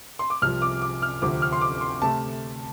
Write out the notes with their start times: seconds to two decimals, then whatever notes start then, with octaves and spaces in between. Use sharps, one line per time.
0.19 C6
0.30 D6
0.42 C2 C3 F3 F6
0.62 D6
0.82 D6
1.02 F6
1.21 D2 C3 F3 C4 D6
1.42 F6
1.52 C6
1.61 D6
1.81 C6
2.02 C3 A3 A5